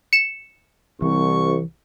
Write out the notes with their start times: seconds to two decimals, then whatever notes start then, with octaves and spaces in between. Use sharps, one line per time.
0.13 C#7 E7
1.02 C2 E3 C#6